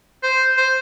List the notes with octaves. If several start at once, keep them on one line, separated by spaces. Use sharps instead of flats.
C5
C5